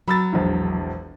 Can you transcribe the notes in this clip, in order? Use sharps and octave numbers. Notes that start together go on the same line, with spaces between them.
F#3 B5 E6 A6
E1 A#1